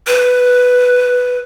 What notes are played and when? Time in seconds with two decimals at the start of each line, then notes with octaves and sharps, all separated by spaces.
0.07 B4